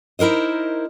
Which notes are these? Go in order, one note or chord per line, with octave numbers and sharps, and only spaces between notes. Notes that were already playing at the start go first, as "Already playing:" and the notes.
D#4 E4 A#4 C5 D#5